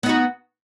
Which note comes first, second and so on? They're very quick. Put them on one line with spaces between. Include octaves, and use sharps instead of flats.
B3 D#4 F#4